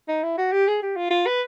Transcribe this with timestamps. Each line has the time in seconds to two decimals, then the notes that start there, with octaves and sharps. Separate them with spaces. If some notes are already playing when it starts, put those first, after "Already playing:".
0.08 D#4
0.23 E4
0.38 F#4
0.52 G4
0.68 G#4
0.82 G4
0.97 F4
1.11 F4
1.26 B4